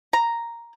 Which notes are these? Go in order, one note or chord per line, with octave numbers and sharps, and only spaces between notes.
A#5